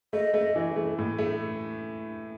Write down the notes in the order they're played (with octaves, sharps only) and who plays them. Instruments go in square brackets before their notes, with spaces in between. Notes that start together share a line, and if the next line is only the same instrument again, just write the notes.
[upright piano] A3 [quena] D#5
[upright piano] A3
E3
A3
A2
A3